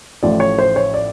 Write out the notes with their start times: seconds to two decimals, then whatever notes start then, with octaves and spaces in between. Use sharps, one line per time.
0.23 A1 A2 F3 D5
0.40 C#5
0.59 C5
0.76 C#5
0.94 D5